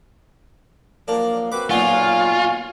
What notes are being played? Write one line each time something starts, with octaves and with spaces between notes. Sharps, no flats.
F3 F#3 A#3 D4
C4 F#4 B4 D6
B1 A#2 F#3 B3 F4 F5 G#5 C#6